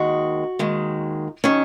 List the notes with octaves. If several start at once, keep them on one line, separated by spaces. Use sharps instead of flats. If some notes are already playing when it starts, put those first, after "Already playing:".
Already playing: D#2 D#3 G#3 F#4
D#2 D#3 G#3
D#3 F#3 C#4